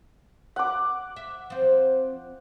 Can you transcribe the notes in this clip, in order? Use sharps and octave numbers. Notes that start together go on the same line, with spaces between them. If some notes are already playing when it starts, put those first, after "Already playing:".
F#5 D6
E5
F3 C4